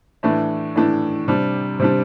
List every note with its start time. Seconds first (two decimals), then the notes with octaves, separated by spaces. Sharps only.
0.23 A2 E3 A3 D4
0.76 A2 E3 A3 D4
1.28 C3 G3 D4
1.79 C3 G3 D4